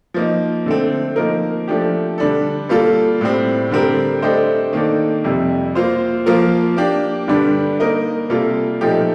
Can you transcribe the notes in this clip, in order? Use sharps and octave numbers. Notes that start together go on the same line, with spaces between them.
F3 A#3 D#4
D3 A3 C4
F3 A#3 D#4 A#4
F3 A3 D4 G4
D3 G3 D4 A4
G3 A#3 F4 A4
A2 G3 C4
D3 G3 C4 G4 A#4
A3 D4 G4 C5 D#5
D#3 A#3 D4 A4
F2 C3 G3
A#3 F4 C5
F3 A#3 F4 A#4
A#3 D4 G4
G2 D3 G3 D4
A#3 D#4 A#4 D#5
C3 G3 A#3 F4 A4
A#2 F3 A3 D#4 G4